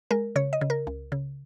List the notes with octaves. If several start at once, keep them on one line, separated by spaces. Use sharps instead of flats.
G#3 A#4
C#3 C#5
D#5
C#3
A#4
C#2
C#3